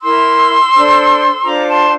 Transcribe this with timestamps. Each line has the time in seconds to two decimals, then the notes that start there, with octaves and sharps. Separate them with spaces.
0.01 E4 A#4 C6 E6
0.73 D4 A4 C5
1.43 D4 F4 A4 C5 A#5 D6
1.67 A5 C6